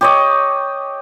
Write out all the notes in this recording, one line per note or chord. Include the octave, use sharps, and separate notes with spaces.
G4 C#5 D#5